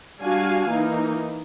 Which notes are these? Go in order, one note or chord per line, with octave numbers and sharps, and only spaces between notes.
G3 D4 F#4 F5 G#5
E3 A#3 D#4